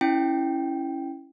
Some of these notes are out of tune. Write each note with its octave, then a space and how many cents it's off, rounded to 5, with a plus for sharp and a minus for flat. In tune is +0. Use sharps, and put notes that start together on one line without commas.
C#4 +0 E4 +0 G5 +0